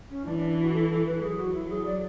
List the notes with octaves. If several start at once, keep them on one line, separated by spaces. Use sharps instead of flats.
C#4
E3 D4
D4
D4
F#4
A4
A4
B4
F#3 G#4
F#4
E4
G#4
D5